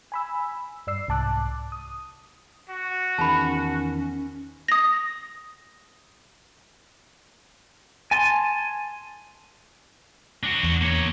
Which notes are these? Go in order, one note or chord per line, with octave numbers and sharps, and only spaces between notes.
G#5 B5 E6
G2 D5 E6 C7
C2 G#2 A5 D6 F#6
D#6
F#4
E2 D#3 C#4 A5 B5
D#6 A#6
G#5 A5 C6
D4 F#4
E2
A#3 C#5